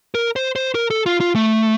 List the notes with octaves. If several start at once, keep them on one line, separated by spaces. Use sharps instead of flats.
A#4
C5
C5
A#4
A4
F4
F4
A3